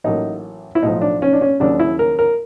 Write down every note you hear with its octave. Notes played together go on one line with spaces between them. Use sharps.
A1 A2 F#3 A#3 D#4
E4
B1 A2 F3 D#4
D4
C#4
D4
C#4
D#2 C#3 F#3 D4
E4
A#4
A#4